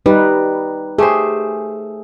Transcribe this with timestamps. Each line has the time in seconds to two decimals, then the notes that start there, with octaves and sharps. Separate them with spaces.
0.06 G3 D#4 B4
0.98 A3 G4 G#4 C5